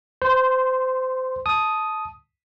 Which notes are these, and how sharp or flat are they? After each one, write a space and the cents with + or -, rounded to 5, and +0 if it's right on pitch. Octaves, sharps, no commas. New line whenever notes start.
C5 -25 C6 +0
A5 -15 D#6 +5